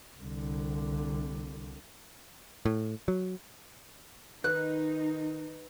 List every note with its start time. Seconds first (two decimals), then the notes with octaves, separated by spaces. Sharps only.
0.17 C2 D3
2.65 A2
3.08 F#3
4.44 D#3 D#4 B4 F#6